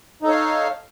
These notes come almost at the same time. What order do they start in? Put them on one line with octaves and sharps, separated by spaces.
D#4 A4 C#5 F5